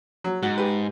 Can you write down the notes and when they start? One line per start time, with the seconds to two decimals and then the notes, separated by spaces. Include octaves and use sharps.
0.24 F#3
0.43 G#2 F#4
0.58 G4 B4